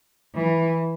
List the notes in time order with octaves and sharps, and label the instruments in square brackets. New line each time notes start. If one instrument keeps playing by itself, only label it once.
[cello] E3